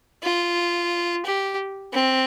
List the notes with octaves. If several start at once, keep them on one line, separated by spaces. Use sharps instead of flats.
F4
G4
C4